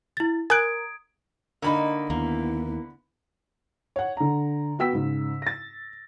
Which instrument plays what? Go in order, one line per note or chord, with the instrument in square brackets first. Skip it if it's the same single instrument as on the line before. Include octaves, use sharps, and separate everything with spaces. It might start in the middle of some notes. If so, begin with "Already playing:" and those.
[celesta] E4 A6
[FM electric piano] A#4 [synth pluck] G#5 F#6 [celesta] D#6 G#6 D7
[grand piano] D3 B5 [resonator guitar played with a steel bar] A#3 D#4
[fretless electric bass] D#2 [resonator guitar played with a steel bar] A#3 [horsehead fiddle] B3 E4
[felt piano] C#5 F#5
D3 A#5
B3 F#4 G5 E6 B6
G#2 C#3
A6 A#6